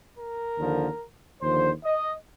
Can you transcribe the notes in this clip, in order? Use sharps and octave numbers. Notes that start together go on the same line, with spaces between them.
A#4
D#2 D3 F3
D#2 D3 F3 C5
D#5